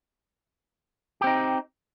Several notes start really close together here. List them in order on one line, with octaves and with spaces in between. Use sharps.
G4 C4 D#4